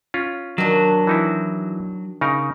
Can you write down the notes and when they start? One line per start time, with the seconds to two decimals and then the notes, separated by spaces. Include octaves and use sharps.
0.14 C#4 F4
0.58 D#3 F#3 D4
1.07 E3 D#4 E4
2.21 C#3 D#4 A#4